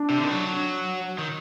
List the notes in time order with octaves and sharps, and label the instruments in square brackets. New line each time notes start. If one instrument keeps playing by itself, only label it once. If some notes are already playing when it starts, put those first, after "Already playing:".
Already playing: [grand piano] D4
[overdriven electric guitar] C3
D3
D#3
F#3
D#3